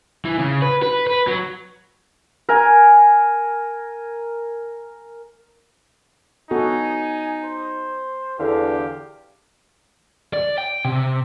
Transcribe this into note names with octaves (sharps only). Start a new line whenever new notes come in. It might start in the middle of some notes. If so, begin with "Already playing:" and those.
E3
C#3
B4
B4
B4
F#3
A#4 G#5
B3 D#4 F#4 A4 G#5
C5
E2 D3 G4 F5
D5
G5
C3